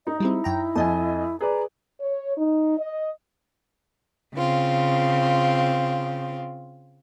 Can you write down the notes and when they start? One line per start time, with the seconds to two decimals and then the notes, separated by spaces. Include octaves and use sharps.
0.07 D#4 D#5
0.20 G3 G#3 C4 E4
0.44 F#2 G5 A#5
0.75 F2 D#5 G#5 A5
1.41 G#4 B4 D5 A#5
2.00 C#5
2.38 D#4
2.78 D#5
4.36 C#3 C4 F4